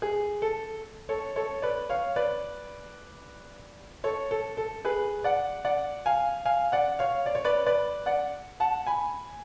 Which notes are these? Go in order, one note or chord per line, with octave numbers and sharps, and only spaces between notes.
G#4
A4
A4 C#5
A4 C#5
B4 D5
C#5 F5
B4 D5
A4 C#5
A4
A4
G#4 B4
D5 F#5
D5 F#5
F5 G#5
F5 G#5
D5 F#5
C#5 F5
D5
C#5
B4 D5
B4 D5
D5 F#5
F#5 A5
G#5 B5